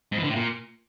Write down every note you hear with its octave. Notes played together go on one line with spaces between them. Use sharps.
G#2
E3
D3
A2
A#2